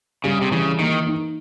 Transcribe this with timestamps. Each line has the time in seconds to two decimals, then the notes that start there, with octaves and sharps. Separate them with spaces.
0.24 C#3 G3
0.41 C3
0.51 C#3 E3
0.79 D#3 A#3
1.07 D#4